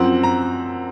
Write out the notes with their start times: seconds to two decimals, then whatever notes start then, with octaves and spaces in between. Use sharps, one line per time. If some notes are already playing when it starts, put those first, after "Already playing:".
Already playing: F#2 F3 C4 F#5
0.23 A#5